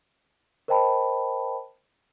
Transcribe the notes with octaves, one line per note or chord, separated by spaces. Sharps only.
A#4 C5 D#5 G5 A5 B5